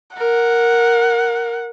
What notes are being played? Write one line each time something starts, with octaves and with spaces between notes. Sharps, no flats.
A#4 F#5